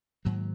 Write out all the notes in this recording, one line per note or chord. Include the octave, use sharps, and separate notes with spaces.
G#2 D#3 F#3 A#3